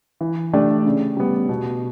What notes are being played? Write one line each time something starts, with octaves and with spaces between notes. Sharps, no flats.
E3
A3 D4 G4 D5
C#3
G3 B3
B2